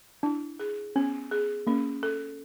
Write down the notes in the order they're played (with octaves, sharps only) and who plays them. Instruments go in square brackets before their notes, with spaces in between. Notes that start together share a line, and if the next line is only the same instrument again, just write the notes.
[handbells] D4 [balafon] E4
[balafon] G#4
[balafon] B3 [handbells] C#4
[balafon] G#4
[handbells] A#3 [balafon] C#4
[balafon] A4